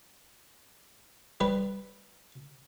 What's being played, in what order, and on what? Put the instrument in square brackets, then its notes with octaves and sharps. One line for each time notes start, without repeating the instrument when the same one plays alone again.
[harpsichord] G3 B4